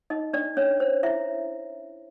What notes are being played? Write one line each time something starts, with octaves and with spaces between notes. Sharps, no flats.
D#4 D#5
D4 D5
C#4 C#5
C5
E4 E5